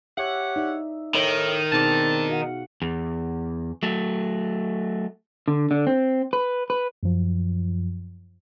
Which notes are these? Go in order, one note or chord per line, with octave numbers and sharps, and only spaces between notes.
G4 C#5 E5 F#5
D#4 D5 E5
A2 D#3
B2 C4 D4 D#4 G#4 A5
F#4 F5 F#5
E2
F#3 A3
D3
D3
C4
B4
B4
F#2 F3